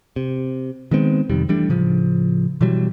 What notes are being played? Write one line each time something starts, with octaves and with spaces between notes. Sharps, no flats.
C3
D#3 G#3 B3 C4
F2 C3 D#3 G3
E3 G3 A3 D4
A2 C#3 F3
B2 E3 F#3 G3